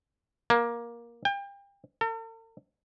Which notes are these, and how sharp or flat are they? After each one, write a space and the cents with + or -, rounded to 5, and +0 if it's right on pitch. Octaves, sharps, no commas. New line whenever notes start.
A#3 +15
G5 +35
A4 +45